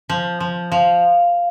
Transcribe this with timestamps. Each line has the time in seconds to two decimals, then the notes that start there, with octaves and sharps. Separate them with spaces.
0.09 F3
0.40 F3
0.72 F3 F5